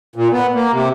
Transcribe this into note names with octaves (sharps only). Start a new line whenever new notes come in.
A#2
B3
A#3
C3